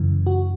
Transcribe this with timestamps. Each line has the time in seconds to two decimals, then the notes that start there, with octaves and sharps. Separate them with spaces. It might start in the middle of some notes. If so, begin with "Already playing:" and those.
Already playing: F#2 C#3 E3
0.26 F#4